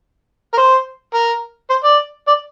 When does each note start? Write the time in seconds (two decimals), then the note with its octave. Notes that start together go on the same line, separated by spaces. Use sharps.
0.54 A#4
0.58 C5
1.14 A#4
1.70 C5
1.84 D5
2.27 D5